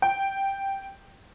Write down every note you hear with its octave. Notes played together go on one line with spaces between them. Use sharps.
G5